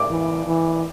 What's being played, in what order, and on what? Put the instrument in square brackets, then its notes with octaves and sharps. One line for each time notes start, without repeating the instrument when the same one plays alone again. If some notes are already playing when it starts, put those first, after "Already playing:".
Already playing: [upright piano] D6
[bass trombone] E3
E3